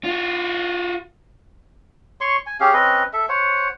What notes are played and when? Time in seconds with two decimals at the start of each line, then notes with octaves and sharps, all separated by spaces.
0.04 F4 F#4
2.21 C#5 C6 C#6
2.46 G#5
2.60 C#4 G4 G#4 F5
2.74 C4 C#4 B4 D#5
3.13 A4 E5
3.29 C5 C#5 F#5